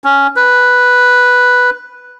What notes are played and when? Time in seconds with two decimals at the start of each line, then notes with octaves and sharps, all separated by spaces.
0.04 C#4
0.36 B4